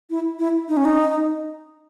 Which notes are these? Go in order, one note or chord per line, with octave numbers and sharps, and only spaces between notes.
E4
E4
D#4
C#4
D#4